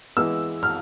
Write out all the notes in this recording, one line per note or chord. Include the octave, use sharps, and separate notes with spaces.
E3 G#3 B3 E6
F6